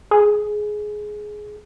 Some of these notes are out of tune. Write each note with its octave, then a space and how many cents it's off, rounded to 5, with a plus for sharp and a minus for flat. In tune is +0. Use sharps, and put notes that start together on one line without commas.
G#4 +15